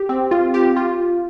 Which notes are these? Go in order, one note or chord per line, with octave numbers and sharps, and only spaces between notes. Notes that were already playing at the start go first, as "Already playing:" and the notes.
Already playing: G4
C4
F4
G4
F4